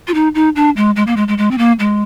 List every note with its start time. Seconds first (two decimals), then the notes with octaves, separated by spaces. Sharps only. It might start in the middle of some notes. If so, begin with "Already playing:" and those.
0.08 F4
0.14 D#4
0.35 D#4
0.56 D4
0.76 G#3
0.96 G#3
1.07 A#3
1.17 G#3
1.28 G#3
1.38 G#3
1.51 C4
1.58 A#3
1.79 G#3